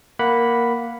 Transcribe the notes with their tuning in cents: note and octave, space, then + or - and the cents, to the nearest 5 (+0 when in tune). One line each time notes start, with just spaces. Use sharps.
A#3 +0 F#5 +0 B5 +0